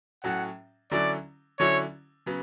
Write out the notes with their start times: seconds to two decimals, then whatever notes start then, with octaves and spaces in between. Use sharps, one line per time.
0.24 A2 F#3 C#4 F#5
0.91 D3 F#3 C#4 E4 D5
1.59 D3 F#3 C#4 E4 C#5
2.26 C#3 F#3 B3